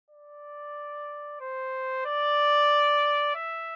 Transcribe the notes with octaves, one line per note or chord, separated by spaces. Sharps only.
D5
C5
D5
E5